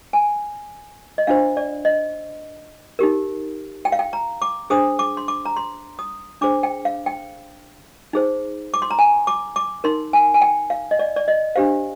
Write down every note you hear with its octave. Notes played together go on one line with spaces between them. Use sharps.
G#5
D#5
D4 F4 C5 F5
D5
D#5
D#4 G4 A#4
G5
F5
G5
A#5
D6
D4 G#4 C5 D#6
D6
C6
D6
A#5
C6
D#6
D4 G#4 C5 D6
G5
F5
G5
D#4 G#4 C5
D6
C6
A#5
G#5
D6
D6
D#4 A#4 C6
G#5
G#5
G5
F5
D#5
D5
D5
D#5
D4 G4 C5 F5